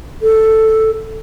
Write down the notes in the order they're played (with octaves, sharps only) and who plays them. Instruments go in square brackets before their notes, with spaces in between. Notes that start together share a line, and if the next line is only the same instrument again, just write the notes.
[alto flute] A4